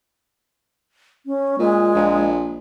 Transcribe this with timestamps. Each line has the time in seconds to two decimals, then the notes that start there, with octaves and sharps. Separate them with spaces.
1.26 C#4
1.59 A#2 G#3
1.95 A#1